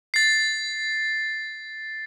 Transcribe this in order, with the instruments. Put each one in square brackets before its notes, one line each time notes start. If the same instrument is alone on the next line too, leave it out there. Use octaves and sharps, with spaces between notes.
[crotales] A6 C7